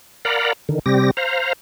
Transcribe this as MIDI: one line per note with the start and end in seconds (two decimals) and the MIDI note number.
0.25 0.53 70
0.25 0.53 74
0.25 0.53 77
0.25 0.53 78
0.25 0.53 82
0.25 0.53 83
0.69 0.79 50
0.69 0.79 51
0.86 1.11 48
0.86 1.11 55
0.86 1.11 60
0.86 1.11 67
0.86 1.11 94
1.17 1.53 72
1.17 1.53 77
1.17 1.53 82